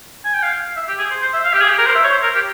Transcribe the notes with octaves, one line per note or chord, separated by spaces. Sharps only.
G#5
G5
F5
E5
G4
G#4
C5
C5
E5
F5
G4
G#4
G4
A#4
C5
E5
C#5
C5
A#4
G4